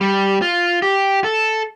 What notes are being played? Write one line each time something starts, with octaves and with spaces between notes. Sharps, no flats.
G3
F4
G4
A4